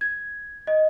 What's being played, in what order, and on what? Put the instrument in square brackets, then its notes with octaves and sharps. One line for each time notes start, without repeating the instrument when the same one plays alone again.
[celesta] G#6
D#5